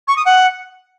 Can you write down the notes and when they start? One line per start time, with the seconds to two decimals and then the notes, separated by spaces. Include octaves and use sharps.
0.08 C#6
0.17 D#6
0.25 F#5